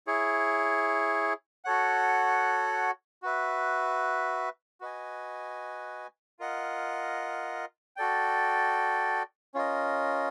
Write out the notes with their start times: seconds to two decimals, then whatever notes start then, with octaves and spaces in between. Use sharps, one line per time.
0.07 E4 G#4 C#5
1.65 F#4 A4 C#5 F#5
3.22 F#4 B4 E5
4.81 F#4 B4 D#5 G#5
6.39 F4 A#4 D#5 F#5
7.96 F#4 A4 D5 G5
9.54 C#4 F4 A#4 D#5